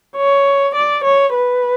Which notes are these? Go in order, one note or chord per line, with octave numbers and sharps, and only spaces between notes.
C#5
D5
C#5
B4